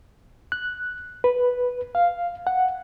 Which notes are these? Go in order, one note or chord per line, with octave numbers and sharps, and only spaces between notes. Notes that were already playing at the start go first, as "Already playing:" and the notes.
F#6
B4
F5
F#5